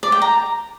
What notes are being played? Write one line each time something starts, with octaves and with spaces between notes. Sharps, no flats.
D5
G5
A#5